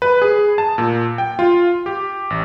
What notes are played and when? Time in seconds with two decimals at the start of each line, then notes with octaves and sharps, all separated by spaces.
0.02 B4
0.22 G#4
0.58 A5
0.78 A#2
1.18 G5
1.39 F4
1.86 G4
2.30 A1